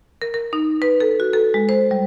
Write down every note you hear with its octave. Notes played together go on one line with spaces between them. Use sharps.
A#4
A#4
D#4
B4
A4
F#4
A4
G#3
C5
G3